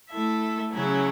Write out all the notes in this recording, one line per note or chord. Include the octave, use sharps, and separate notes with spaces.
A3 E4 A4 E5
C#3 F#3 C#4 E4